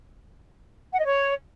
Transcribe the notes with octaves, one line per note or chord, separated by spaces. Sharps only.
F#5
D#5
C#5